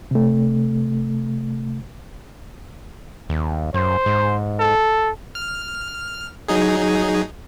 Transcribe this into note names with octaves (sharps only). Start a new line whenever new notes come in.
C3 A3
D#2
F#2 C5
G#2
A4
F6
F#3 D#4 G#4